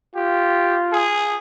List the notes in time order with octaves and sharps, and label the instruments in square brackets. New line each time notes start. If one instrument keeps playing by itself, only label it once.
[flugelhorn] F4 [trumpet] G4
[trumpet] G#4